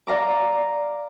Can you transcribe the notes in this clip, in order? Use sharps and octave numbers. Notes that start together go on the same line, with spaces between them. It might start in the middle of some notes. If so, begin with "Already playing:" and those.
D5 F5 A#5 D6